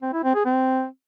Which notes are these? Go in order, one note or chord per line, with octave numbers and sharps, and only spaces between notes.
C4
E4
C4
G#4
C4